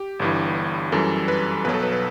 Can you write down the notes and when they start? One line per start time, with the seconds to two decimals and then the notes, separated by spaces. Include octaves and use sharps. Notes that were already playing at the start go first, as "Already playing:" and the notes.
Already playing: G4
0.19 G1 G2 E3
0.92 F#2 E3 G3 A4
1.28 B4
1.64 B1 B2 F#3 B4
1.74 A4
1.82 B4
1.92 B4